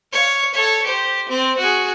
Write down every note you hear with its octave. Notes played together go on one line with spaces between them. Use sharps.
C#5 F5
A4 C#5
G4 C5
C4
F#4 G#4